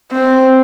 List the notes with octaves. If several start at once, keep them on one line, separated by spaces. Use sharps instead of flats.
C4